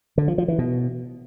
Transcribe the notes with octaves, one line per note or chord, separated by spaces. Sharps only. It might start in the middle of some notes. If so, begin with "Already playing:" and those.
D3
F3
F3
E3
B2